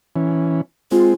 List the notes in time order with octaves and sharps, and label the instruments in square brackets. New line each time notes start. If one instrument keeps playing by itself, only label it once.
[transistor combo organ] E3 C#4
[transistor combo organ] G#3 C4 [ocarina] F4